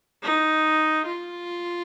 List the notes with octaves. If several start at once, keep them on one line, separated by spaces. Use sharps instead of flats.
D#4
F4